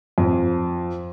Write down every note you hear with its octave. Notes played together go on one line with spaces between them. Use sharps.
F2